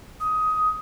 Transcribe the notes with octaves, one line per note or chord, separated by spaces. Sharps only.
D#6